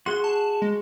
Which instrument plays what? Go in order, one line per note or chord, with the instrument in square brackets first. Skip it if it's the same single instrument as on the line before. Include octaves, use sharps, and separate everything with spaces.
[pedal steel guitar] F#4 G#4 F#6 [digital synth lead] C6
[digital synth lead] A5
G#3